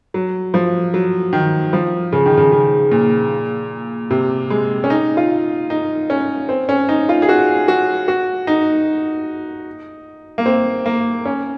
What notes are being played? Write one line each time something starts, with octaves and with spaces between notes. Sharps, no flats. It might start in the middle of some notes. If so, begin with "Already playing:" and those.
F#3
F3
F#3
D#3
F3
C#3
D#3
C#3
C#3
A#2
C3
G#3
C#4
D#4
F4
D#4
C#4
C4
C#4
D#4
F4
G#4
F#4
F#4
F#4
D#4
A#3
C4
A#3
C#4